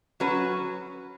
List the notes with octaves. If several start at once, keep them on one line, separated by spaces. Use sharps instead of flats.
F#3 C#4 F#4 B4